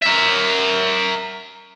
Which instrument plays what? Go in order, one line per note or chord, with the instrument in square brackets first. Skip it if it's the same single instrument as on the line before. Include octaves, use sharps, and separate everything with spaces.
[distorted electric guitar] A#4 E5